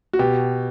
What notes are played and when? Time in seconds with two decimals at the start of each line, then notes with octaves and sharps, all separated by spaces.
0.13 F#4
0.19 B2 G4